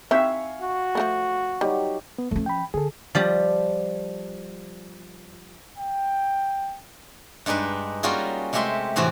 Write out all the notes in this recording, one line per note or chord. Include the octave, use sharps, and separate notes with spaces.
C4 D#4 G4 E5 F5 G#5 C#6
F#4
F3 A3 B3
F#3 G3 D#4 G4
B3
F3 A3 C#4
G5 B5
D3 G#4 A4
F3 G3 G4
G5
G2 G#3 D4 D#4 B4
G3 A#3 C#4 F4 F#4 G#4
C3 G#3 A3 G4 E5 C6
A2 C3 E3 C4 F#4